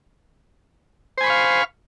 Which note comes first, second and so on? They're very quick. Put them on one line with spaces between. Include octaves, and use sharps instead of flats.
C5 G#5 B5 C#6 F5